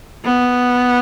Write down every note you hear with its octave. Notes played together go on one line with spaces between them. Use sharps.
B3